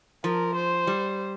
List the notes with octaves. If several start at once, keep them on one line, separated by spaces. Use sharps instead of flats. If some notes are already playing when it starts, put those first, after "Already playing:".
F3 A#4
C5
G3